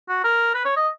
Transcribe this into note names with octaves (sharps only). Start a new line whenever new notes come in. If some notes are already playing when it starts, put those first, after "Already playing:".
F#4
A#4
B4
C#5
D#5